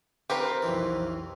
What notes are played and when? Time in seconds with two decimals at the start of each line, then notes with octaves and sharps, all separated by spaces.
0.30 C4 G4 A#4 B4 B5 C#6
0.62 B1 F2 E3